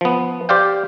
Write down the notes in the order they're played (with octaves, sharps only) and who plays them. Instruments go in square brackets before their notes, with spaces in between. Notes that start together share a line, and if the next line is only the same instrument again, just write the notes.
[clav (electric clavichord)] F3 B3
G4 C5 D5 F5 G5